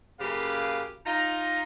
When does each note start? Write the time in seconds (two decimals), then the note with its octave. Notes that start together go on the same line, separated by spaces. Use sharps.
0.20 F#2 C#3 A#3 G4 B4 F5
1.06 D#4 F4 A#5